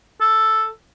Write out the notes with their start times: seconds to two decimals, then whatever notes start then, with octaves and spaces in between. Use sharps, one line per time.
0.21 A4